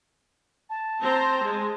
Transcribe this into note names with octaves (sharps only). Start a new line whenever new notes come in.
A5
C4 C5 A#5
G#3